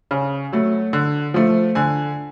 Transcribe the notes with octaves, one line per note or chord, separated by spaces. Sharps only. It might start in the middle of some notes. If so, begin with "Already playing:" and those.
C#3
F#3 A3
D3
F3 A3
D3 G#5